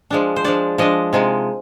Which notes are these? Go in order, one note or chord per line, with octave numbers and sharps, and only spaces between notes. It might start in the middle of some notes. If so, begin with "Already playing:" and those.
F3 G#3 D4
C5
F3 G#3 D4 D5
F3 G#3 D4 D#5
C3 F3 G#3 D#4